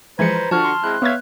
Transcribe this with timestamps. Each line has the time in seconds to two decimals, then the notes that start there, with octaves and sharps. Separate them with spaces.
0.19 E3 F3 G#3 B4 C5 A#5 G#6 C#7
0.51 D3 F3 F#4 A5 C#6 F6
0.65 C6
0.84 G#3 C4 E4 F#6
1.02 B3 C#5 E5 F5 G#6